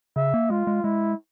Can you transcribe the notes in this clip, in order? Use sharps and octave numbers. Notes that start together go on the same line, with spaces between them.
C#3 E5
A#3
G#3 F4
G#3
G#3 E4